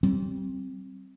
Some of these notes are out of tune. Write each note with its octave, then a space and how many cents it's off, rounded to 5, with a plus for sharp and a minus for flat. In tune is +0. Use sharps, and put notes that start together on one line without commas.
G3 -35 C4 +15